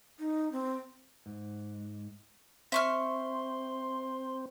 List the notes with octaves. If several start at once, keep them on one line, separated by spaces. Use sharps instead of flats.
D#4
C4
G#2
C4 E5 C6 C#6 F6